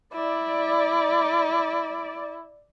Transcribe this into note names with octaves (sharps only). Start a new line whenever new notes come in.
E4 D5